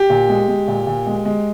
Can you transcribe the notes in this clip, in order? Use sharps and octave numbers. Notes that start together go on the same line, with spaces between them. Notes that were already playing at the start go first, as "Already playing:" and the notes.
Already playing: G4
A#2
G#3
G#3
A#2
A#2
G#3
G#3